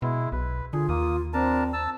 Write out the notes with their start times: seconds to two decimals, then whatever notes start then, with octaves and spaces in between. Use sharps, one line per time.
0.02 B2 G#3 E4
0.32 B1 B4
0.73 D3 F4 G#4
0.89 D#2 A#3 D#6
1.33 C4 D4 A#4 A5
1.73 A5 E6